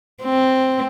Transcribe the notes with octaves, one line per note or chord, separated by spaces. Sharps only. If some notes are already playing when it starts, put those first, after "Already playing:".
C4